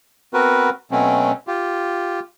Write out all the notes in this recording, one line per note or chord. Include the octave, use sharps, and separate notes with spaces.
B3 C4 F#4 A#4 B4
B2 F#3 A3 C4 C#4
F4 G4